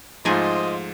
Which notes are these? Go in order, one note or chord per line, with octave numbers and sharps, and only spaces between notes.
G#2 F3 A3 D#4 F4 G#4 C5 D#5